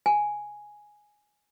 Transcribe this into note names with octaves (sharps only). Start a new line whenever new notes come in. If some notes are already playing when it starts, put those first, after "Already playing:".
G#5